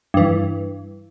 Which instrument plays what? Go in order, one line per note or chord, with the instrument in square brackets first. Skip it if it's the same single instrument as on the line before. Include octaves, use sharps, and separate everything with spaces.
[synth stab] G2 E3